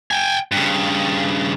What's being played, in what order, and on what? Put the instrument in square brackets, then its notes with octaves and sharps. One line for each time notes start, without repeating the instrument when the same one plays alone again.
[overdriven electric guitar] G5 G#5
G2 C#3